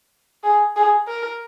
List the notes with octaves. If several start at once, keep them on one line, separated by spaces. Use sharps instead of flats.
G#4
G#4
A#4